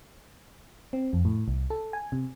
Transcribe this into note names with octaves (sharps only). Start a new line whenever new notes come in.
C4
F2
A2
C2
A4
G#5
C3